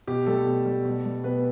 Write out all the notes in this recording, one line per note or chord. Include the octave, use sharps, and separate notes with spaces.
B2 G4
G3 A3 A4
B2
G3
B2
G3
B2 B3 B4